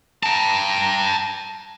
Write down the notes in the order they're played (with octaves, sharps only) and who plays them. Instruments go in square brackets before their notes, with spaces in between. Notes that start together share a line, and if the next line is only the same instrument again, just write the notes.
[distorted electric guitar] G5 A5 [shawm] A#5